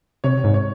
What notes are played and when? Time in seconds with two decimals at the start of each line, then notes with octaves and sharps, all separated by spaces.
0.24 C3 C#5
0.44 G#2
0.54 C#5